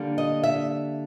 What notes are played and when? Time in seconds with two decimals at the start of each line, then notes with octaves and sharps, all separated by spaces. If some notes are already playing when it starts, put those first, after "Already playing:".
Already playing: D3 G3 A#3
0.18 D#5
0.43 E5